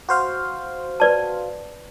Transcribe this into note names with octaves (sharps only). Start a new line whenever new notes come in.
F#4 C5 F5
B4 D5 A5